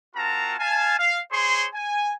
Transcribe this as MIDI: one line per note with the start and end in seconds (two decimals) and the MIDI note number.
0.16 0.55 60
0.16 0.55 65
0.16 0.55 66
0.16 0.55 70
0.16 0.55 81
0.16 0.55 82
0.59 0.95 77
0.59 0.95 80
0.59 0.95 81
0.98 1.20 77
1.32 1.67 68
1.32 1.67 72
1.32 1.67 73
1.32 1.67 84
1.74 2.13 80